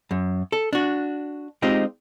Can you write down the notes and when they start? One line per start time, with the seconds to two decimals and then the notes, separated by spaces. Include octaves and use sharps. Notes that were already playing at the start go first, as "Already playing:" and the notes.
0.11 F#2
0.52 A4
0.73 D4 F#4
1.62 G#3 C4 D#4 F4 G4